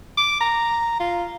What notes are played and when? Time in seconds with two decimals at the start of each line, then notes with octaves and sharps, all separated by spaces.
0.17 D6
0.41 A#5
1.00 F4